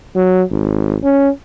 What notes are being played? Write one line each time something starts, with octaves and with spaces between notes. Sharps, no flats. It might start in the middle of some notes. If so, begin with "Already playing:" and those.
F#3
G#1
C#4